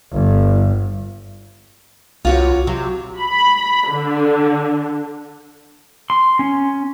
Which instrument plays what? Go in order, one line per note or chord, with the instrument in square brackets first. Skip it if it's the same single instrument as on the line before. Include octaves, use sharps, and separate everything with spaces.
[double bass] G1
[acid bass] C2 [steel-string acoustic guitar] F4 F#4 C#5
[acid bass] C3 [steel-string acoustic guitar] F#3
[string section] B5
D3
[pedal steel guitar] C6
C#4